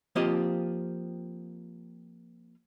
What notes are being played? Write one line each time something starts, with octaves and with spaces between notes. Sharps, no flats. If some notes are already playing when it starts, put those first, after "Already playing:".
F3 A#3 C4 F4 G4 D#5